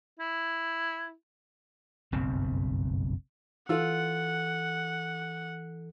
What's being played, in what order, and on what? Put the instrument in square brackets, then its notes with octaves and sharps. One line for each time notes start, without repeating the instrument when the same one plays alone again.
[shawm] E4
[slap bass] F#1 B1 G2 C4
[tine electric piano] E3 A4 [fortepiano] F4 E6 [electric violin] F#5